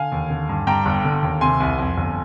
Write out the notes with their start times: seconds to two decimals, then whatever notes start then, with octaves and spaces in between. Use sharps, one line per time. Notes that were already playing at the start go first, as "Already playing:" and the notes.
Already playing: D3 F5 G#5
0.12 D#2
0.30 D3
0.49 G2
0.67 G2 G5 A#5
0.85 G1
1.04 D3
1.22 D#2
1.41 C3 G#5 C6
1.60 C2
1.79 F2
1.97 G1